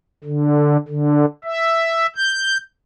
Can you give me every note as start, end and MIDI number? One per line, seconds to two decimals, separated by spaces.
0.24 0.77 50
0.88 1.25 50
1.44 2.06 76
2.16 2.57 91